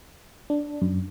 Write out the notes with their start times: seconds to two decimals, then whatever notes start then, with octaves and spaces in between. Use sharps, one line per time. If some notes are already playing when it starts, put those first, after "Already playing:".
0.50 D4
0.82 F#2